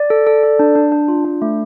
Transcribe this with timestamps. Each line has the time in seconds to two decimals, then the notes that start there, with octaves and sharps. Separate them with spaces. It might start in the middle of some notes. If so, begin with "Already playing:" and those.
Already playing: D5
0.10 A4
0.27 A4
0.44 A4
0.59 D4
0.75 D4
0.92 D4
1.08 F4
1.24 D4
1.42 A3